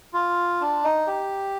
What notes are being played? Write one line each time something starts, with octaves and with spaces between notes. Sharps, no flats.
F4
D4
D#4
G4